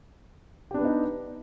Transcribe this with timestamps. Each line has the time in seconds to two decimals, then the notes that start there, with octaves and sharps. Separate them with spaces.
0.71 G4
0.74 D4
0.78 B4
0.81 B3
0.85 D#4